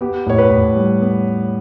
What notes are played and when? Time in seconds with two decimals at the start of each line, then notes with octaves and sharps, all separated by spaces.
0.01 B3 G4
0.26 A2 C#5
0.38 B4
0.51 A2
0.76 G3
1.01 B3